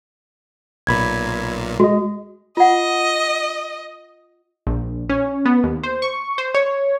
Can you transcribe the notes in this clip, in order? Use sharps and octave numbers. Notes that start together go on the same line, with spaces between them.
B1 A#2 B5 G#6
G#3 F#4 D#5
F4 D#5 F#5
A#1
C#4
B3
D#2
C5
C#6
C5
C#5